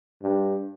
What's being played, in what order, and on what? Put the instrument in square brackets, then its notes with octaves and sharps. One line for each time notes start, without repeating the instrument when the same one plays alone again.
[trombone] G2